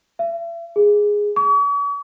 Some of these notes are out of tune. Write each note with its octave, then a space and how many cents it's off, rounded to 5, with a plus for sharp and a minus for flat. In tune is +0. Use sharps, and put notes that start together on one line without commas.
E5 +40
G#4 -5
C#6 +45